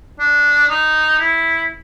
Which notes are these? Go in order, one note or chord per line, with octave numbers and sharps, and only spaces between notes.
D4
D#4
E4